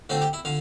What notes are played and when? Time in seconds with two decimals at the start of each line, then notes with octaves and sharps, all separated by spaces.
0.10 D3 A3 C4 F4
0.21 G4
0.33 E4
0.45 D3 F4